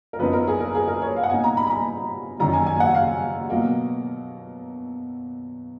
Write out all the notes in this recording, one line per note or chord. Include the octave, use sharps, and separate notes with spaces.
A#4
F#2 F3 B3 D#4 B4
A#4
G#4
A#4
G#4
A#4
C#5
F5
F#5
B2 A#3 D#4 G#5
A#5
B5
A#5
B5
F#2 D#3 F#3 A#5
G#5
G#5
F#5
F5
B2 F#3 A#3